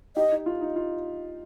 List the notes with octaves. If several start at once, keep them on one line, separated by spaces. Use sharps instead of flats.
D#4 G4 D#5
D#4
F4
D#4
F4